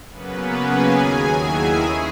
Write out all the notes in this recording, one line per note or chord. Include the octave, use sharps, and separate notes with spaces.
C#3 F#3 A#3 B3 C#4 B4
G#4 G#5
D#2 D#3 F#3
E4 E5
C#4 G#4